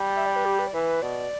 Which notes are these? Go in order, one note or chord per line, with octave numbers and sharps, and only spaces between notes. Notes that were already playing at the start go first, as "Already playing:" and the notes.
Already playing: G3
E5
D5
B4
G4
B4
D5
E3 B4
B2 D5